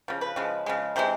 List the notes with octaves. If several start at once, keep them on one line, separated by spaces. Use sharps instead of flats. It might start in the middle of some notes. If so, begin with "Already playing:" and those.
C#3 F3
B4
C#3 F3 G#3
C#3 F3 G#3
C3 E3 G#3 C5